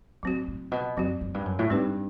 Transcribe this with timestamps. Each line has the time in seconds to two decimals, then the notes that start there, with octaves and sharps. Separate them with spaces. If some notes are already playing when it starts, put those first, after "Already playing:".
0.23 A2 F#3 C4 F#4
0.48 A2
0.72 B2
0.97 F#2 F#3 C4 F#4
1.21 F#2
1.34 G2
1.45 F#2
1.59 A2
1.70 G2 G3 C4 D#4 G4 B4